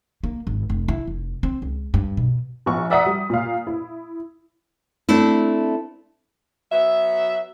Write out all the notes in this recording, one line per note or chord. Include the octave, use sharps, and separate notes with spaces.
A#3
G#1
F1
E4
F1
C4
C#2
G2
B2
A#1 B3 C#6
D5 E5 F#5 A#5 D#6 B6
G3
A#2 F5
E4
A3 C4 D4 E4
F#3 B3 E5